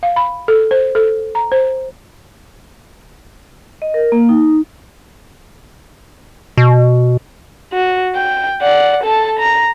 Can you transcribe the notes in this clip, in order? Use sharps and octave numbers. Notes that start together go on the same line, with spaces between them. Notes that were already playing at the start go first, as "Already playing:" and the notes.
F5
B5
A4
C5
A4
A#5
C5
D#5
A#4
A#3
D#4
B2
F#4
G5
D5 F#5
A4 A5
A#5